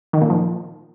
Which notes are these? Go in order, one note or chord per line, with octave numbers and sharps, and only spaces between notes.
D#3
A#2
F3